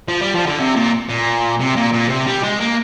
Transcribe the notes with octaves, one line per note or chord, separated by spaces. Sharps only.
F3
G3
F3
D3
C3
A#2
A#2
C3
A#2
A#2
C3
G3
G#3
A#3